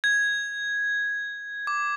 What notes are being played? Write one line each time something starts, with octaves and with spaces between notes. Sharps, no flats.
G#6
D6